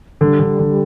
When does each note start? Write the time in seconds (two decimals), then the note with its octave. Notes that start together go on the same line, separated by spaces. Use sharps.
0.21 D3 G3
0.40 D3
0.59 D3